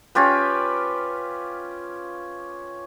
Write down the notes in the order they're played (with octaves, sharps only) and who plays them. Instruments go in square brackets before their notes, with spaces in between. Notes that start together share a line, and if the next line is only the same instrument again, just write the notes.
[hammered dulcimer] C#4 F4 G4 B4